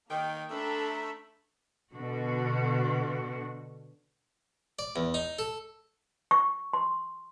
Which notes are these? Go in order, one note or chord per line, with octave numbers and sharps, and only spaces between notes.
D#3 A#3 G5
A3 D4 A4 E5 A#5 B5
B2 D3 F#4
D5
E2
D#4
A4
C#6
C6